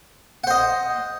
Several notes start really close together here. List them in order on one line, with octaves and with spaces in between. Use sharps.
F#5 C5 D#5